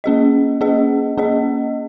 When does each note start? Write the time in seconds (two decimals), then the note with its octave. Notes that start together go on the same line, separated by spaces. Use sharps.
0.04 A#3 C#4 G#4 D#5
0.61 A#3 C#4 G#4 D#5
1.18 A#3 C#4 G#4 D#5